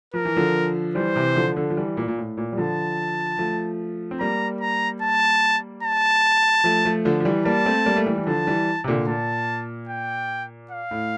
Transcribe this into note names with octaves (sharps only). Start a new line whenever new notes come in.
F3 A#4
E3
D3 F3
E3 G3 C5
C3 E3
D3 F3
D3 F3
F3
E3 G3
A#2
A#2
A2
A#2
G3
D3 F3 A5
F3 A3
C4
G3 A#3 A#5
A#5
A5
A5
F3 A3
F3 A3
D3 F3
F3
E3 G3
G3 A#3 A5
A3 C4
G3 A#3
A3
E3 G3
E3
D3 F3 A5
E3 G3
C3
A#2 D3
A#2 A5
G5
F5
A2